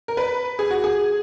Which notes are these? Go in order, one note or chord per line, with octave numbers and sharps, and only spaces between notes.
A#4
B4
G#4
F#4
G#4